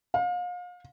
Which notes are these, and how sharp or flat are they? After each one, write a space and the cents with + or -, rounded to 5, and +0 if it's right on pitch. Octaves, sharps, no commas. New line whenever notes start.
F5 +35